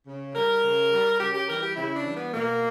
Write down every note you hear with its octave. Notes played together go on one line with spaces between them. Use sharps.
C#3
G3 A#4
C#3
G3
C#3 G4
G4
E3 G3 A#4
G4
C#3 E4
D4
E3 G3
B3
B2 A#3